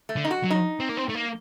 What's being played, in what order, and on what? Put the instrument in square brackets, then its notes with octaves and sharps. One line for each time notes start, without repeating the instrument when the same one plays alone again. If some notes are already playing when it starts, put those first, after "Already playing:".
[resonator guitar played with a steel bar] A3
[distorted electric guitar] D3
[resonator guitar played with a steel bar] D#4
F#4
[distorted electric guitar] F#3
[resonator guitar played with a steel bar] D#4
[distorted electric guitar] C4
A#3
C4
A3
A#3